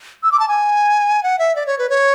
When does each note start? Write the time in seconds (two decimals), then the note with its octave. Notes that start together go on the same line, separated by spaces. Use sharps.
0.23 E6
0.32 D6
0.40 A5
0.48 G#5
1.23 F#5
1.39 E5
1.56 D5
1.66 C#5
1.79 B4
1.90 C#5